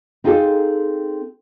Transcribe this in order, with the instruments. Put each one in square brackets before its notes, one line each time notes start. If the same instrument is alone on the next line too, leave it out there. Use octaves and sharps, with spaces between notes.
[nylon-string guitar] C4 D#4 F4 G#4 A4